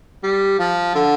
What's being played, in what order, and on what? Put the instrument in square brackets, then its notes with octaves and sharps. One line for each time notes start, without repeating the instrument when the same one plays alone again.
[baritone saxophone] G3
F3
D3